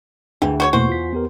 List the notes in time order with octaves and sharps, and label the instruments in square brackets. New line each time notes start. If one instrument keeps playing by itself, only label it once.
[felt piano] D2 G#4 G5 [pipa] E3
[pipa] F#4 C5 C#5
[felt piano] E2 [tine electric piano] B2 A3 A#3 [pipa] F#4 C5
[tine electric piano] F4 B6
B3 G4 A#4